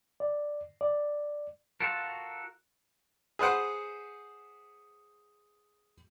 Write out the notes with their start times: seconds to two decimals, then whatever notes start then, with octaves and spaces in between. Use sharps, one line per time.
0.20 D5
0.81 D5
1.80 F4 F#4 A4 A#4
3.39 G#4 B4 C5 F#5